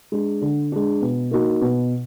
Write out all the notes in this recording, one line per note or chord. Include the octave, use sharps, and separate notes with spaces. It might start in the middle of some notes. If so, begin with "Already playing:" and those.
G#3 D4
D3
G#3 D4
B2
A#3 D#4 F#4
B2